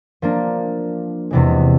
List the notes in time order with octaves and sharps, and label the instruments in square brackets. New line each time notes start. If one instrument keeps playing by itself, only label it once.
[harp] F3 A#3 D4
E2 C3 E3 G#3